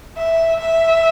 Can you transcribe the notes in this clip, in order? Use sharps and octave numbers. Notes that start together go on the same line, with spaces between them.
E5
E5